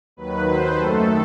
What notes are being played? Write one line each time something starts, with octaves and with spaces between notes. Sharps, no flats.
D#2 D#3 F#3 B4
C5
F#2 D#3 A3 A4